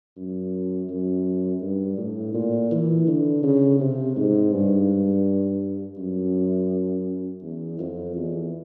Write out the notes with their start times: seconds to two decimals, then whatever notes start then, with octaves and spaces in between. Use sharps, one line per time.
0.17 F#2
0.89 F#2
1.61 G2
1.98 A2
2.34 A#2
2.71 E3
3.07 D3
3.43 C#3
3.80 C3
4.16 G#2
4.52 G2
5.98 F#2
7.42 E2
7.79 F2
8.16 E2